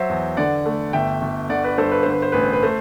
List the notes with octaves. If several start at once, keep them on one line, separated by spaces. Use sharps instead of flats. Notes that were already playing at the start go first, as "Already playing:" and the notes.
Already playing: F#3 C5 E5
E2
D3 D5 F#5
A3
G1 E5 G5
G1
D3 D5 F#5
B4 D5
G2 A4 C5
B4
D3 C5
B4
C5
A1 B4
C5
B4
A3 C5